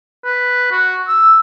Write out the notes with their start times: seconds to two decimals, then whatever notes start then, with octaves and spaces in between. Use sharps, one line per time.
0.25 B4
0.71 F#4
1.08 E6